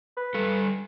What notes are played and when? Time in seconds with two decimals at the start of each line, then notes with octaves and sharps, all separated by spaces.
0.17 B4
0.34 G3 A4